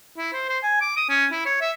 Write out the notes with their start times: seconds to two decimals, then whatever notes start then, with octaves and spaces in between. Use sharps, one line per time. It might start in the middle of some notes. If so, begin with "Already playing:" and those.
0.18 E4
0.33 C5
0.49 C5
0.63 G#5
0.81 D6
0.97 D#6
1.09 C#4
1.32 E4
1.46 C#5
1.61 E5